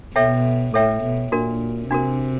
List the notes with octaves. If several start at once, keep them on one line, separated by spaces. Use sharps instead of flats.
B2 A4 C#5 E5 G5
A2 A4 C#5 E5 G5
B2
A#2 D4 F#4 A#4
C3 D4 F#4 A#4